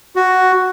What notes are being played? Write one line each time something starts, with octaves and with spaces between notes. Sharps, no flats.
F#4